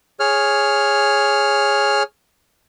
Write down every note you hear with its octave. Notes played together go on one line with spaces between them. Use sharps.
G#4 C#5 F6